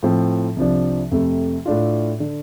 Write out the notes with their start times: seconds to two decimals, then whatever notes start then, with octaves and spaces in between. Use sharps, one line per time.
0.03 A2 F3 C4
0.56 C2 C3 F3 D4
1.12 F2 C3 A3
1.66 A2 A3 D4 F4
2.20 D3